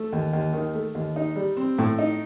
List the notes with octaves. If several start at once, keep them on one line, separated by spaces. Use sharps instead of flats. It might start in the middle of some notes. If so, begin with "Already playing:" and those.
Already playing: A3
D#2
D#2
D#3
A3
D#2
D#4
G3
C4
A2
D#4